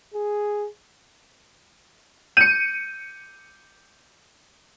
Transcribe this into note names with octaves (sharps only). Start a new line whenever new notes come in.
G#4
G6 C#7 D#7